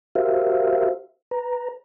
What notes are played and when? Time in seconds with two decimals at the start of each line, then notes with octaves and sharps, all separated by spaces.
0.15 F#4 G4 A#4 C5 E5 F5
1.31 B4 A#5